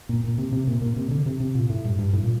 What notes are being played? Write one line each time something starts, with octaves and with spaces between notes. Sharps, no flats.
A#2
A#2
C3
C3
A#2
A#2
C3
D3
C3
C3
A#2
A2
G2
G2
A2
A#2